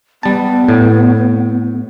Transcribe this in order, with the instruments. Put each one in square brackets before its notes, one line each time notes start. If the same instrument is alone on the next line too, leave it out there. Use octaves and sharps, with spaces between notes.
[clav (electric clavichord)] G3 A5 [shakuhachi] B3
[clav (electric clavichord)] A2